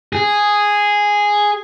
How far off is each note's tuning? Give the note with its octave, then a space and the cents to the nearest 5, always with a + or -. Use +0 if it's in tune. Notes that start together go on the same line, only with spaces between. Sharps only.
G#4 -5